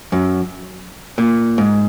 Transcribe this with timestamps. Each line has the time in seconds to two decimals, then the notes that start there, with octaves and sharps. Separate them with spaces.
0.12 F#2
1.18 A#2
1.58 G#2